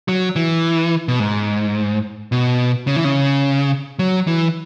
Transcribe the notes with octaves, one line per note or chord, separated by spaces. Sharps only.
F#3
E3
B2
G#2
B2
C#3
E3
C#3
F#3
E3